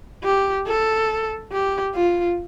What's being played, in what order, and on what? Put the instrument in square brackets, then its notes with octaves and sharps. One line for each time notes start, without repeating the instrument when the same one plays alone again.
[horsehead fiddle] G4
A4
G4
F4